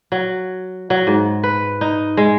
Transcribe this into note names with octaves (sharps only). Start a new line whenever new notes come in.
F#3
F#3
G#2
B4
D#4
G#3